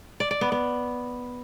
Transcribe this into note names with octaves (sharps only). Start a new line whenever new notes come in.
D5
D5
B3
B3